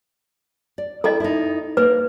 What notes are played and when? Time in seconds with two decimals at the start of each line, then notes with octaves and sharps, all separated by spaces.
0.78 D5
1.04 E4 A4 D#5 G5
1.20 D#4 E4
1.77 A#3 B4